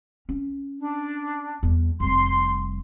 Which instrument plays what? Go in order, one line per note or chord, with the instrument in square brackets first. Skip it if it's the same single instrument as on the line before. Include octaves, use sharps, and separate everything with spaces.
[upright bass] C#4
[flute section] D4
[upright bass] E2 G3
[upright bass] F1 G3 [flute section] C6